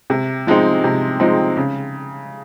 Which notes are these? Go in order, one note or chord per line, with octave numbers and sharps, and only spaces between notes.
C3
F3 G#3 C4 D#4
C3
F3 G#3 C4 D#4
C#3